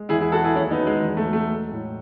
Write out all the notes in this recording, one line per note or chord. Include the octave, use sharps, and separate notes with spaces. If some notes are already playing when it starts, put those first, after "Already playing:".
Already playing: G#3
E2 E4 G#4
E4 G#4
F#3 F#4 A4
E4 G#4
D#2 C#4 E4
B3 D#4
F#3
G#3
E2
A3
F#3
A3
G#3
A2